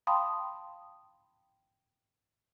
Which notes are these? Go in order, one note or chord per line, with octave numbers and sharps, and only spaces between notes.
F5 G5 A5 B5 C6 D#6